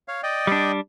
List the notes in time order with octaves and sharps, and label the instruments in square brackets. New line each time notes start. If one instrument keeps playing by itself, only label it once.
[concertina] C#5 F5
D5 D#5 G5
[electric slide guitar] G3 D4